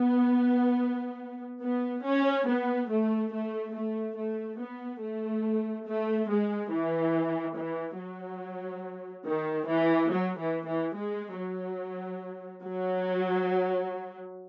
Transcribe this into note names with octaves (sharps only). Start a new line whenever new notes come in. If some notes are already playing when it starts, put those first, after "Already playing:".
Already playing: B3
B3
C#4
B3
A3
A3
A3
A3
B3
A3
A3
G#3
E3
E3
F#3
D#3
E3
F#3
E3
E3
G#3
F#3
F#3